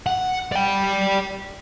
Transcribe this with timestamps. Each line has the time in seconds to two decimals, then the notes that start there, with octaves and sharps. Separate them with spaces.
0.07 F#5
0.52 D5 G5